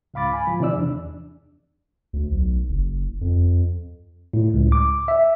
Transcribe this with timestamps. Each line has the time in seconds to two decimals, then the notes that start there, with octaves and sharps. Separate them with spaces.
0.14 C#2 G#2 F5 B5 D6 A6
0.33 G#5 B5
0.47 F3
0.60 C3 E3 D#4 D5 E6
0.76 E2 D4
2.13 D2
2.32 B1
2.69 F#1
3.21 F2
4.33 A2
4.54 C#2
4.72 D6
5.08 E5